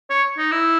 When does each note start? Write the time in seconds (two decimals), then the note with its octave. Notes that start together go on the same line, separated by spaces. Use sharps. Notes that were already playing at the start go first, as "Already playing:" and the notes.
0.10 C#5
0.38 D#4
0.52 E4